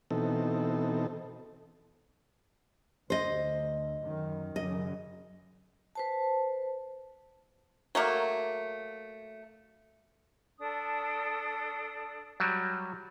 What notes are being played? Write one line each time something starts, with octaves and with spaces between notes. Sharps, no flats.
B2 E3 C4 D#4 A4
D2 C5 D#5
F#2 D#3
F#2 C#3 D#5
B4 C5 A5
F#3 A3 A#3
D4 A4 D#6
F#3 G3